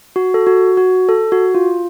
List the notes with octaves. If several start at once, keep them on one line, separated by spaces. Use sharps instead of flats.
F#4
A4
F#4
F#4
A4
F#4
F4